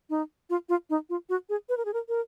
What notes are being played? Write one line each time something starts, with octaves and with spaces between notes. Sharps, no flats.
D#4
F4
F4
D#4
F4
F#4
G#4
B4
A#4
G#4
A#4
A#4